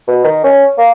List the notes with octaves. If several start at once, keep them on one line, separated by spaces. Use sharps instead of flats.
B2
D#3
C#4
A#3